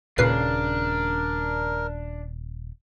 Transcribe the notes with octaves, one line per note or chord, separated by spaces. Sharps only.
D#1 A#2 C#3 D4 A#4 B4 C7